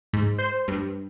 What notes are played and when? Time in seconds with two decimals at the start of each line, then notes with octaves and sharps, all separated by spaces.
0.13 G#2
0.38 C5
0.68 G2